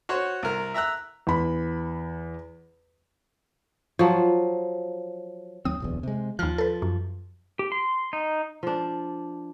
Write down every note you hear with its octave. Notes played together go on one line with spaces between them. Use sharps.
F#4 C5 C#5
C2 A#4
E5 A#5 E6 F#6
E2 B5
F3 F#3
D#2 F#3 C4 D#6
D1 B1 E2
C3 G#3
D#2 F3 F6
A4 B4
F#2
G4
C6
D#4
F3 D4